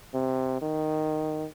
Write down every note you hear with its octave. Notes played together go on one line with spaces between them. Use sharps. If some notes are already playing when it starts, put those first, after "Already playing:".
C3
D#3